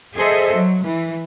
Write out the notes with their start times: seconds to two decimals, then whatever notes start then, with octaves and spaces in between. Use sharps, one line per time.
0.16 G#4 A4 C5 D#5 E5
0.55 F#3
0.85 E3